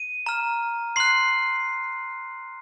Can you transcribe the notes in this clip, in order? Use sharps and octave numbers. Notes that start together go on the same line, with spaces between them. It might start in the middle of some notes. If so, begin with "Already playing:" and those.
Already playing: D#7
A#5 F6
C6 F#6 C7